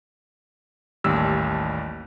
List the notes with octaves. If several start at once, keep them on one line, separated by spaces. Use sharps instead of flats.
A1 D#2 G3 E6